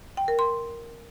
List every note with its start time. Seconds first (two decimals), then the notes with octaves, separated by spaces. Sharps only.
0.17 G5
0.28 A#4
0.39 C6